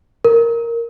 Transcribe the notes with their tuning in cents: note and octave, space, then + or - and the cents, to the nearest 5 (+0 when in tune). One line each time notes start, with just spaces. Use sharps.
A#4 +0